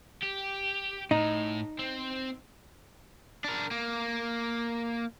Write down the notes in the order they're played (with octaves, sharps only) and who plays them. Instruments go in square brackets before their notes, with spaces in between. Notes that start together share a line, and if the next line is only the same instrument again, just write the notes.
[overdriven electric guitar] G4
[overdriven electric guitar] A2 [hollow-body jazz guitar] D#4
[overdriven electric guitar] C4
D4 A#4
A#3